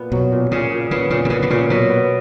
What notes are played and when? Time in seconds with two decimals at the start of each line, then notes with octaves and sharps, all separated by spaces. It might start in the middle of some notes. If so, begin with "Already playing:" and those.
Already playing: A#2 B3
0.12 B2 F#3
0.32 A#2
0.51 A#2 C#3
0.72 A#2
0.91 C#3 B3
1.10 A#2 C#3
1.25 B2
1.30 C#3 B3
1.42 B2
1.50 A#2 C#3
1.70 B2 F#3
1.90 B3